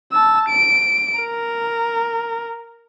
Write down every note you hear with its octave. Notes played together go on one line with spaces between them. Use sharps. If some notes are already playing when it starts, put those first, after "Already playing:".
A5 E6
D7
A#4